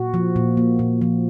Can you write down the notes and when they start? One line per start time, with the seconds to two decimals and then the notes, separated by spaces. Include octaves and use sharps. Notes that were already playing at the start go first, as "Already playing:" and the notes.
Already playing: A#2 F#4
0.14 F3
0.36 A#2
0.57 A#3
0.79 A#2
1.02 F3